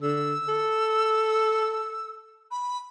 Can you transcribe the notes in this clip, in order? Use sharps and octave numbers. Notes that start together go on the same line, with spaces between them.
D3 E6
A4
B5